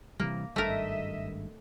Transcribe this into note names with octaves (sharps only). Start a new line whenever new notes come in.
C3 E3 G3 A#3
G#1 G2 A3 A#4 D#5 E5